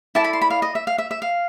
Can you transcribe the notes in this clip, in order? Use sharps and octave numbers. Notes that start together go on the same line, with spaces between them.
E4 A4 D5 A5
B5
C6
B5
F5
D#5
E5
F5
E5
E5
F5